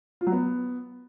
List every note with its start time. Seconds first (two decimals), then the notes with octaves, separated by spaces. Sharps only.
0.21 F4
0.27 F#3
0.32 B3